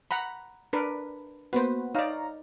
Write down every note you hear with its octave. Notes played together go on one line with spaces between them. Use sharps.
F#5 A#5 B5
D4 A#4 B4
A#3 B3 F#4 B4 C5
D#4 C#5 D5 F5 A#5